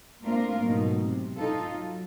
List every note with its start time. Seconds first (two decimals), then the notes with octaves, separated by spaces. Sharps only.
0.22 A3 A#3 C4 D4 F4 A#4
0.63 G#2 B2 F#3 A3 D#4
1.00 C3
1.37 D#4 F4 A4
1.70 F#3